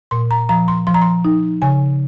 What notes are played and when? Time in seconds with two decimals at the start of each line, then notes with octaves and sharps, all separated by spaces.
0.11 A#2 C6
0.31 A#5
0.49 F3 A#5
0.68 C6
0.87 F3 C6
0.94 A#5
1.02 C6
1.25 D#4
1.62 C#3 G#5